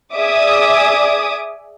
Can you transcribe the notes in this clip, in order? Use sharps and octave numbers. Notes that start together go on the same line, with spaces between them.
G#4 D5 E5 D6 D#6